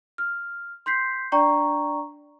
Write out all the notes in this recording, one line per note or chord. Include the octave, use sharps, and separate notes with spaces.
F6
C6 G6 B6 C7
D4 D5 G5 A#5 C#6